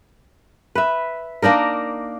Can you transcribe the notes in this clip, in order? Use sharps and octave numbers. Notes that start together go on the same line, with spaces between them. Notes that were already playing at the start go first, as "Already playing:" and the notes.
B4 E5
A#3 D4 D#4 A#4